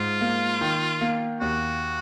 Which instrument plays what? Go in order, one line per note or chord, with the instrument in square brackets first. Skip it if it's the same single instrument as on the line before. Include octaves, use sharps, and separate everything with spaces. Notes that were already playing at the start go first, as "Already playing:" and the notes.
Already playing: [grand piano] G#2 [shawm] F4
[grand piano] A#3
D#3
A#3
[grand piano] D#2 [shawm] F#4